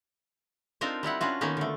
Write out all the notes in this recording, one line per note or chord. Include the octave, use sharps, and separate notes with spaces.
C4 D4 D#4 F4 A#4 C5
G3 D#4 E4 F#5
C#4 D4 F4 F#4
D#3 A#3 B3 C#4 D#4
D3 A3